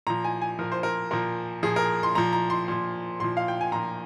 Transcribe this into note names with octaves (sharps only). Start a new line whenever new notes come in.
A#2 F3 A#5
G#5
G#5
A#2 F3 A#4
C5
A#4
A#2 F3 A#4
A#2 F3 G#4
A#4
C6
A#2 F3 A#5
A#5
C6
A#2 F3
A#2 F3 C6
F5
G5
G#5
A#2 F3 A#5